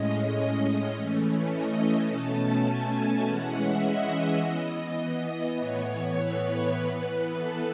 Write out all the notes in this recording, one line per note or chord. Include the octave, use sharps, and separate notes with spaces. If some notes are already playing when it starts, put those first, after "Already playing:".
Already playing: A2 G#3 C#4 D#5
E3 A3 C#4
D#5
B2 A3 C#4 A5
G#5
E3 G#3 C#4 F#5
E5
D#5
E3 B3
A2 E3 B3 C#5
B4
E3 B3
A4